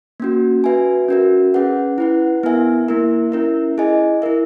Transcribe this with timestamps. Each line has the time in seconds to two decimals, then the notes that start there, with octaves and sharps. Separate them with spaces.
0.20 A#3 C#4 F#4
0.64 F#4 B4 E5 G#5
1.09 C#4 F#4 A#4 E5
1.54 C#4 G#4 B4 F#5
1.98 E4 B4 F#5
2.43 B3 E4 A#4 E5 G#5
2.88 A#3 E4 A#4 E5
3.32 C#4 E4 A#4 E5
3.78 E4 G#4 D#5 G#5
4.22 E4 A#4 E5